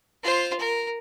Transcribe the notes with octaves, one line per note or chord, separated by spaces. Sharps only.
F4 C5
A#4